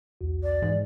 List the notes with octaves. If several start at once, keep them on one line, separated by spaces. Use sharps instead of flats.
B1 E2 F#4
D5
G#2 E3